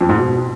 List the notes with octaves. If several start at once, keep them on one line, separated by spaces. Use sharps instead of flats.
F2
G#2
B2